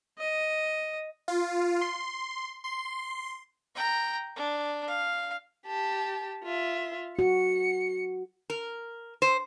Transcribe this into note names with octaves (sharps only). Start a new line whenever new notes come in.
D#5
F4
C6
C6
G5 A#5
D4
F5
G4 A5
F4 E5
F#4 C#7
A#4
C5